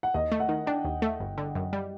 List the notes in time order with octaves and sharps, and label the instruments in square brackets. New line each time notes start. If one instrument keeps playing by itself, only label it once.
[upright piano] F#5
[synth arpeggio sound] D#2 [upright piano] D#5
[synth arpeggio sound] A3
[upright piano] F#5
[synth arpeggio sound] D#3
[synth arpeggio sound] D4 [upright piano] G5
[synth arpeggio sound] D#2
A3
G1
D3
F#2
G3